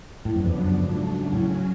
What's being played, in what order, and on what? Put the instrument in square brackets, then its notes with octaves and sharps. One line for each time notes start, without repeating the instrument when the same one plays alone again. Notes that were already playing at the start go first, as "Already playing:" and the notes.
[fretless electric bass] A2 [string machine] C#3 F3 B3 D4
[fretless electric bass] F#2
F2
F#2
[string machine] G#2 F#3 A3 D4
C#3 F#3 C#4
[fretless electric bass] A2